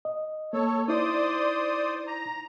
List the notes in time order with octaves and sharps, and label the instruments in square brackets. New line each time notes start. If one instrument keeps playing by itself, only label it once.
[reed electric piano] D#5
[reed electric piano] A#3 [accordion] A4 C#5
[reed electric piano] D#4 E4 [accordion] C5 D5 D#6
[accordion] A#5